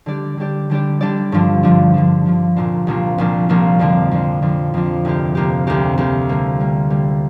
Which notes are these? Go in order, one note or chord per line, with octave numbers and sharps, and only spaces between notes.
D3 G3 D4 G4 D5
D3 G3 D4 G4 D5
D3 G3 D4 G4 D5
D3 G3 D4 G4 D5
G2 D3 F3 D4
G2 D3 F3 D4
G2 D3 F3 D4
G2 D3 F3 D4
C2 A#2 F3 A#3 D4
C2 A#2 F3 A#3 D4
C2 A#2 F3 A#3 D4
C2 A#2 F3 A#3 D4
F2 D3 F3 D4
F2 D3 F3 D4
F2 D3 F3 D4
F2 D3 F3 D4
D2 C3 A#3 G4
D2 C3 A#3 G4
D2 C3 A#3 G4
D2 C3 A#3 G4
D3 G3 A#3
D3 G3 A#3
D3 G3 A#3